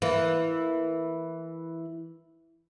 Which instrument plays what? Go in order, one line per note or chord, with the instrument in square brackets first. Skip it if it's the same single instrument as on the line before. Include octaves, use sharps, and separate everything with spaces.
[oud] E3 A#3